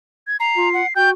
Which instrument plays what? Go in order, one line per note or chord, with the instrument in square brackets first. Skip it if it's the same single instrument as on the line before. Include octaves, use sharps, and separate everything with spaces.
[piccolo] G#6
[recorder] A#5 [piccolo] C7
[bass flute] F4
[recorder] F#5
[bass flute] F#4 [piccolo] G5 [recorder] G6